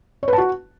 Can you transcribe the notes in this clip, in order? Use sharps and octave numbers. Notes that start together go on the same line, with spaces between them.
C#5
B4
A5
F#4